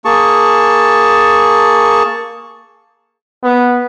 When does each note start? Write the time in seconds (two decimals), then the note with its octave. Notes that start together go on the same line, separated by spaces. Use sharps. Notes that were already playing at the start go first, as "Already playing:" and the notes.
0.05 A#3 G#4 A5 C#6
3.44 B3